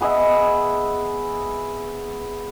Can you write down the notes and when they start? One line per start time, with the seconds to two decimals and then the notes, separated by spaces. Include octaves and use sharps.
0.01 B3 G#4 D#5 E5